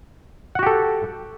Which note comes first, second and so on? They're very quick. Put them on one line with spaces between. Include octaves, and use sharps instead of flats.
F#5 F#4 G4 A4